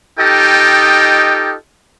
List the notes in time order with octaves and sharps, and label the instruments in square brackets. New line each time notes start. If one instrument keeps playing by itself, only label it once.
[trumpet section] D#4 F4 G4 A4 D#5 G5